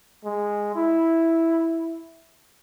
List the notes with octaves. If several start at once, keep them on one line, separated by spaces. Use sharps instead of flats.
G#3
E4